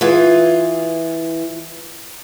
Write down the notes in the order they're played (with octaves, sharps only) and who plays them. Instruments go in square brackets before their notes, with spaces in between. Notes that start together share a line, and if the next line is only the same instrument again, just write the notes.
[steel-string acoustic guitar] E3 F4 G#4